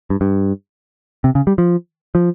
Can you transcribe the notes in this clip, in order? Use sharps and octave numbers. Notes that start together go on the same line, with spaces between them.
G2
G2
C3
C#3
G3
F3
F3